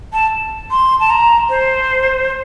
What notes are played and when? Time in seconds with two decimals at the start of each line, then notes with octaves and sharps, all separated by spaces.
0.13 A5
0.71 C6
1.00 A5
1.10 A#5
1.49 C5